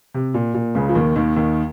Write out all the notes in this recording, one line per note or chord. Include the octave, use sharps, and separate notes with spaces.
C3
A#2
A#2
C#2 C#3
F3
D#2 D#3
D#2 D#3
D#2 D#3